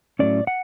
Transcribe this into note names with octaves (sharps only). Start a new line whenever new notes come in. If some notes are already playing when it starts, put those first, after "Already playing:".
A2 F#3 A3 C#4 D5
F#5